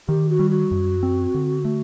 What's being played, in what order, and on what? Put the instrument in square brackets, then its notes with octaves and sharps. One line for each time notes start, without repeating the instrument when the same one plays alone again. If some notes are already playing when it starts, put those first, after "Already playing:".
[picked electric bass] D#3 [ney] G4
[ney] F#4
[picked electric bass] G3
[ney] F#4
[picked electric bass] F#2
C4
D3
A3